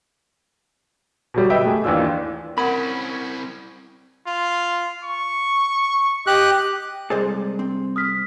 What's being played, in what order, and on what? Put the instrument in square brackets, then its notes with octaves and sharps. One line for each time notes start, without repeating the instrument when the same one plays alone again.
[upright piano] B2 F#3 G3
G4 B4 D#5 E5 G5
A3 G#4
D#2 E3 D4 F4 E6
[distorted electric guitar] C4 E4 [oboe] C#4 [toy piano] A#4 F#5 [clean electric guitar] B5
[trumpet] F4
C#6
[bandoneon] G4 F#6 [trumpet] D#5
[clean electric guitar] C2 [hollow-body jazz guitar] G#3 A4 D5 [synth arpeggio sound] G#4 C5 D#5
[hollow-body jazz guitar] C4
[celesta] D#6 F6 B6